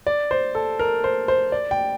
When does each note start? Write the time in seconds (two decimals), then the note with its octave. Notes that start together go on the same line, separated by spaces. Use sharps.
0.07 D5
0.31 C5
0.55 A4
0.79 A#4
1.04 C5
1.28 C5
1.52 D5
1.71 G5